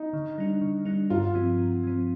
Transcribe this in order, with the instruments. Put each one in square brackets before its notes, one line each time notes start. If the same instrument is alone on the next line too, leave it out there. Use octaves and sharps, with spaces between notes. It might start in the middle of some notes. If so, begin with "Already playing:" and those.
Already playing: [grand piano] D#4
[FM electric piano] D3
G3 D4
D3
G3 D4
[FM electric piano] G2 [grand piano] F4
[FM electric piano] F3 C4
G2
F3 C4